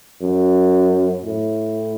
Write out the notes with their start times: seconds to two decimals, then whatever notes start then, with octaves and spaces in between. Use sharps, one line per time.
0.22 F#2
1.24 A2